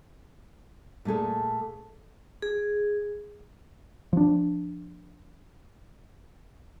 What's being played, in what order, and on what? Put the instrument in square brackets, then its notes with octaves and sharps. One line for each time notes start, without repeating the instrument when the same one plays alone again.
[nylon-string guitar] A#2 A3 G#4 A4
[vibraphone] G#4
[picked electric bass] F3 D4